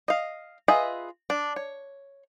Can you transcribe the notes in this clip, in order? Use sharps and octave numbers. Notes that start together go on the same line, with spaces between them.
D#5 F5
F4 G#4 B4 D#5 E5
D4
C#5